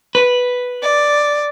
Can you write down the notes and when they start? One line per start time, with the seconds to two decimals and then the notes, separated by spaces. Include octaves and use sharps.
0.15 B4
0.82 D5